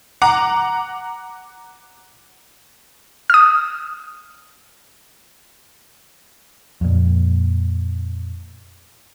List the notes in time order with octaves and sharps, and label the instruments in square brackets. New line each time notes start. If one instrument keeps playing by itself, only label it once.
[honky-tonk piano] F#5 A#5 D6
[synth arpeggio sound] D#6 F6
[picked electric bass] F2 A#2